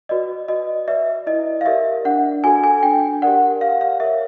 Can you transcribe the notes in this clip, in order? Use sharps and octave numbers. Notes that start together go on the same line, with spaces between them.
F#4 B4 D5 D#5
F#4 D#5
B4 D5 E5
E4 D#5
F5
G4 A#4 D5 E5
D4 F#5
F#4 A4 G#5
G#5
D4 G5
G4 A#4 D5 F#5
G4 F5
F5
A#4 C#5 E5